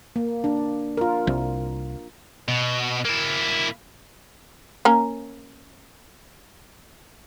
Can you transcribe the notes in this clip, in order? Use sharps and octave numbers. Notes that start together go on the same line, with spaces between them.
A#3
D4
F4 A#4
C2
B2
A#3 E4
A#3 C#4 A#4